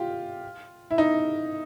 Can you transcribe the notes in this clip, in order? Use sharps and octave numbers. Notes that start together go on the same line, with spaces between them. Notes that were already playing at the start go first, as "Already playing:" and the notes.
Already playing: F4 G4
E4
D#4